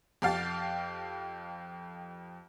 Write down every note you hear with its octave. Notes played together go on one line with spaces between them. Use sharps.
F2 G4 F5 A6